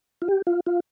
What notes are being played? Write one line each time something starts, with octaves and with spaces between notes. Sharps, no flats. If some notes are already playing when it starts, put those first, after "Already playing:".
F4
G4
F4
F4